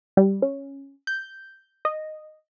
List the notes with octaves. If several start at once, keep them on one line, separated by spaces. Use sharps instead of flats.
G3
C#4
G6
D#5